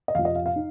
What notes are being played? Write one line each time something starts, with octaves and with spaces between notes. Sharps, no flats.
D#5
F2 C3 F3 F5
D#5
F5
F5
D#4